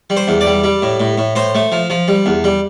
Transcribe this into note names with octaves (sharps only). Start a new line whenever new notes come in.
G3
C5
E2
D5
G3
G3
A2
A2
A2
A2 C5
A3
F3
F3
G3
E2
G3